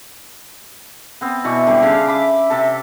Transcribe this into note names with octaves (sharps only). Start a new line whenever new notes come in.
B3 C4
B2 E3 D5 C#6
D3 G3 C4
C#3 F5
E5 B5 D6
C3 A4